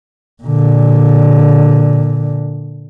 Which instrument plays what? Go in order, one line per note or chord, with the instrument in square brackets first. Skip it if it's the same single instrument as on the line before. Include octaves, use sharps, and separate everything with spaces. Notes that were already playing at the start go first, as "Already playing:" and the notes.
[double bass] A#2 D3